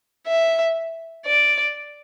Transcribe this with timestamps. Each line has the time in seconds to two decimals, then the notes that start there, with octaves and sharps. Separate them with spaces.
0.27 E5
1.26 D5